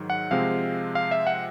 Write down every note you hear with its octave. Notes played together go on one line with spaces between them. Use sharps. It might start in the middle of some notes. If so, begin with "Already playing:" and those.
Already playing: G#2 D#3 F#3
F#5
C3 F3 G#3 C4 F5
F5
E5
F#5